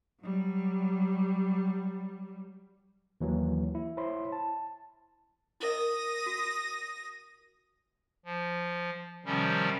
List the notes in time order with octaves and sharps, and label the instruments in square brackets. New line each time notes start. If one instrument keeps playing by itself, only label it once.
[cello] F#3 G3
[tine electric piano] D#2 E3 F#3 A#3
E4
E4 C5 C#5 B5 C6
A5
[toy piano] E4 A#4 D#5 [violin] D#6 A#6
[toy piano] F#4
[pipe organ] F3
C3 D#3 F3 G3 C#4